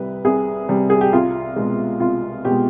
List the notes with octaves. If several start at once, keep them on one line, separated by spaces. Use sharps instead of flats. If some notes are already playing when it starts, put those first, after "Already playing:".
Already playing: C2 C3 G3 B4
C2 G#4
C3 G3
G#4
G4
C2 F4
B2 G#3
C2 F4
B2 G#3 G4